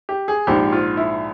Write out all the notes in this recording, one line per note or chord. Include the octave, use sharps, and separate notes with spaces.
G4
G#4
A#1 G#2 F3 G4
F4
E4